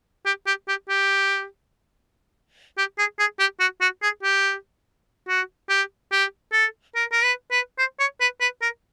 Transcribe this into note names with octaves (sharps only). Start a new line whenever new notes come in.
G4
G4
G4
G4
G4
G#4
G#4
G4
F#4
F#4
G#4
G4
F#4
G4
G4
A4
A#4
A#4
B4
B4
C5
C#5
B4
B4
A#4